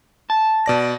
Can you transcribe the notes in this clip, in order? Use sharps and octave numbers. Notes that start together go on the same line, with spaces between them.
A5
B2 D5 A#6